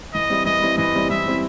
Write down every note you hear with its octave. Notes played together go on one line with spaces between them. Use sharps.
E3 D#5
G3 C4 E4
E3 D#5
G3 C4 E4
E3 D#5
G3 C4 E4
E3 E5
G3 C4 E4